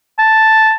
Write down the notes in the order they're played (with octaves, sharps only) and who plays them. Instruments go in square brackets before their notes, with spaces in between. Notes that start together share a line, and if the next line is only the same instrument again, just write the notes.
[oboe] A5